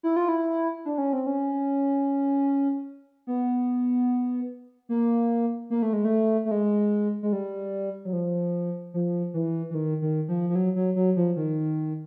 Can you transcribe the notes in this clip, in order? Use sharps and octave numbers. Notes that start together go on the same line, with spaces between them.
E4
F4
E4
D4
C#4
C4
C#4
B3
A#3
A#3
A3
G#3
A3
A3
G#3
G#3
G3
F#3
F3
F3
E3
E3
D#3
D#3
F3
F3
F#3
F#3
F#3
F3
D#3